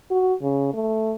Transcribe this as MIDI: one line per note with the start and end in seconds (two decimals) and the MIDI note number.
0.11 0.34 66
0.42 0.69 49
0.74 1.15 57